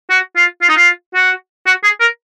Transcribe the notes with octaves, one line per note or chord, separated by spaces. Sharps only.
F#4
F4
F4
D#4
F4
F#4
F#4
G#4
A#4